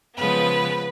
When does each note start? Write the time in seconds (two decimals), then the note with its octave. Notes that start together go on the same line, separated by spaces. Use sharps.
0.17 C#3 F3 G#3 B3 B4